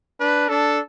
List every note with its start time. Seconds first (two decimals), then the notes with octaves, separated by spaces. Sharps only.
0.20 D4 B4
0.49 D4 A4